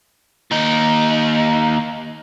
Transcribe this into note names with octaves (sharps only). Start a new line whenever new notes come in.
D#2 D#4